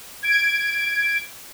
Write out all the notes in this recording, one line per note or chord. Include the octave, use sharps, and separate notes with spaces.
G#6 D7